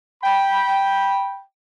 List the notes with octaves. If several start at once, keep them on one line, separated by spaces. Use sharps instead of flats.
G5 B5